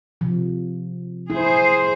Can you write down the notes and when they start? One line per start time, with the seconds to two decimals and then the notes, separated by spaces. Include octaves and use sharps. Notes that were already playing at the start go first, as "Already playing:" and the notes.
0.21 C3 F3
1.30 E4 G#4 C5